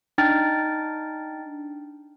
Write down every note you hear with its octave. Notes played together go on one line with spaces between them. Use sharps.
D4 D#4 G5 F6 A6